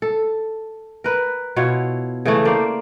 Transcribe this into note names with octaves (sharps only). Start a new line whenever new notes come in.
A4
A#4 B4
B2 E4 F4 C#5
C#3 E3 A3
A#3 C5 D5